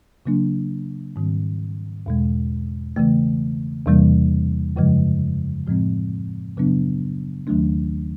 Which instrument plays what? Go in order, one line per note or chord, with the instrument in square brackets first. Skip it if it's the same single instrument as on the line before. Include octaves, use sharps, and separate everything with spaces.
[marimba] C#3 F#3 A#3 D4
G#2 D#3 G3 C4
E2 B2 G#3
C#3 E3 A3
E2 C3 E3 G3 A#3
F#2 C#3 F3 G#3
A2 F3 G#3 C4
F#2 C#3 F#3 B3 D4
D#2 D#3 F#3 A3 D4